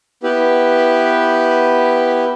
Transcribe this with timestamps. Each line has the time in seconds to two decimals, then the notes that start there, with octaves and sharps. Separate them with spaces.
0.23 B3 E4 G4 B4